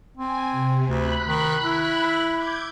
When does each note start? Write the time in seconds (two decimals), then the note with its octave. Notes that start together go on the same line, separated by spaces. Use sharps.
0.17 C4 G#5
0.51 C3
0.89 D2 B5 F#6
1.27 D#3
1.63 E4
2.33 D6 G6 G#6